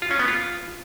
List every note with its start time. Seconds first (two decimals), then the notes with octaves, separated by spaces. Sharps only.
0.02 F4
0.11 C#4
0.19 B3
0.28 F4